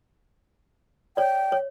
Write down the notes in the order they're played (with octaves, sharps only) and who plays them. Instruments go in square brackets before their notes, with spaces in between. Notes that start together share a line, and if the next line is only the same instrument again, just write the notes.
[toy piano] C#5 D5 [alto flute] G5
[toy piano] C#5